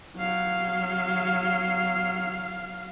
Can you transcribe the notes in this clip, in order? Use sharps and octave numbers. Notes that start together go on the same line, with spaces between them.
F#3 F5